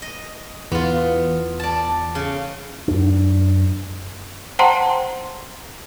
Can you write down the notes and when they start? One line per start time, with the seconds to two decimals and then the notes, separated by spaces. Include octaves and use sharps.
0.02 D#5
0.72 E2 B3 F4
1.60 D5 A5
2.15 C#3
2.88 F#2 D4
4.59 C5 F#5 G5 A5 A#5 C6